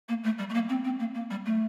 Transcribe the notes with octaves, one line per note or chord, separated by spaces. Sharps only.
A#3
A3
G3
A3
A#3
C4
C4
A#3
A#3
G3
A3